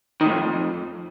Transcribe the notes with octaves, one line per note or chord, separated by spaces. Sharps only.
D#3
A2
F2